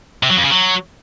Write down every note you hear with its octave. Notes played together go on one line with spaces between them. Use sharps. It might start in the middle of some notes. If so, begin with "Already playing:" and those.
C3
F#3
F2
C#3
F#3